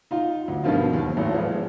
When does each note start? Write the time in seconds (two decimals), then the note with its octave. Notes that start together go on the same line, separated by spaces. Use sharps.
0.11 D#4 F4
0.48 D2
0.64 G2 B2 D#3 F3 D4 F4
0.93 D#2
1.17 G#1 A2
1.33 E3 F3 G#3 B3 F4